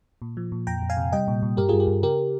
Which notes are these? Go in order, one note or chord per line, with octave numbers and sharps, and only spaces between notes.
A#2
F3
A#2
F2 G5 A#5
F2
F5 G#5
C3
G3 D#5 G5
A#2
A#2
G2 G4 A#4
G2 F4 G#4
G4
G2
C#3 G4 A#4